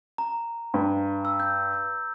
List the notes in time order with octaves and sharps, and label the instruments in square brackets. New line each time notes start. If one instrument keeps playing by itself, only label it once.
[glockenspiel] A#5
[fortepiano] G2
[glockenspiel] E6
G6